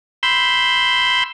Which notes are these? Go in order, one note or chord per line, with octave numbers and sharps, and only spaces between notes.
B5 C6 E6 G6